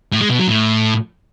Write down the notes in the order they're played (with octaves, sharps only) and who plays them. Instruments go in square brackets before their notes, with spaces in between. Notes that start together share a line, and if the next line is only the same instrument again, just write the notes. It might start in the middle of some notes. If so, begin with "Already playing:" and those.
[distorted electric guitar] A2
G#3
B2
F#3
A2